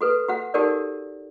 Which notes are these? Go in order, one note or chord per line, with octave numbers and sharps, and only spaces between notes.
F#4 A4 B4
F#4 F#5
D#4 F#4 G4 A4 A#4 D5